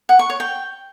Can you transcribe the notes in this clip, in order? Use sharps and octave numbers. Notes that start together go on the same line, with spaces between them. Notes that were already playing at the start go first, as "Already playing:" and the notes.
F#5
C#6
C#5
G5